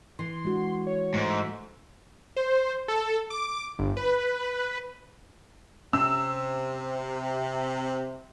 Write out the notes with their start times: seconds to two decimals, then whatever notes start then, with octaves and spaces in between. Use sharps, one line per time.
0.19 E3 C6
0.45 G#3 D4 F#4
0.87 C#5
1.14 G#2 A3
1.30 E5
2.36 C5
2.88 A4
3.30 D6
3.79 G1
3.97 B4
5.93 C3 C#4 E6